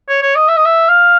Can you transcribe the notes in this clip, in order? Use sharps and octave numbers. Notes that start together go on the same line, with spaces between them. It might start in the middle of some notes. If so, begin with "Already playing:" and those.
C#5
C#5
D#5
E5
D#5
E5
F5